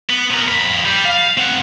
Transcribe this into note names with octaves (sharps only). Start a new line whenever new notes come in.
B3
C3 A#4
F2 B5
G3
F5
C4 F#5